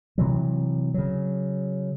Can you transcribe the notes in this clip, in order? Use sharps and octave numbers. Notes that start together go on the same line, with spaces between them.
C3 E3 F#3
C#3 F#3